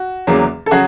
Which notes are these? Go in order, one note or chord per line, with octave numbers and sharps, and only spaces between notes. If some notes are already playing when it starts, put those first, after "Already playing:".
Already playing: F#4
E2 C#3 F#3 A#3
A4
C#3 F#3 F#4 G#4